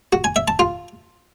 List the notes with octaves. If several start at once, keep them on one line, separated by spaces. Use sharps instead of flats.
F#4
G#5
E5
A5
F4